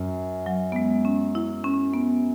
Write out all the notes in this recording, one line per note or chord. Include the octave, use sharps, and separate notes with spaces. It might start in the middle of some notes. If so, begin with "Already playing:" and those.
Already playing: F#2
F#3
B3
G#3
C#4
E4
C#4
B3